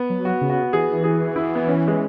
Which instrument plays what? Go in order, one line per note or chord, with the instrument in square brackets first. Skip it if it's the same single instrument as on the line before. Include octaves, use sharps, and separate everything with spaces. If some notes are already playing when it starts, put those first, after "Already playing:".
Already playing: [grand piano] B3
[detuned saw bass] F#3
[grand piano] F#4
[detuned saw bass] C#3
[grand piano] F#4
[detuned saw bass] E3 [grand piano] G#4
[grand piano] G#4
E4
B3
C#4
G#3